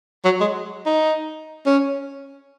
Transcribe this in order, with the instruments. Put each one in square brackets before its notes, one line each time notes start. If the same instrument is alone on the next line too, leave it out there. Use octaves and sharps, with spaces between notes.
[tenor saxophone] F#3
G#3
D#4
C#4